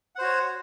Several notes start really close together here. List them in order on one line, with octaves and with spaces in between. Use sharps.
F#5 C5 F#4 C#5